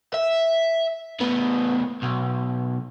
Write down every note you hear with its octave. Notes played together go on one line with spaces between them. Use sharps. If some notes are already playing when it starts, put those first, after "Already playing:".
E5
A2 B3
B1